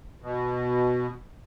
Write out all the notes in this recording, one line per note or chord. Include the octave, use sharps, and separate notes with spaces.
B2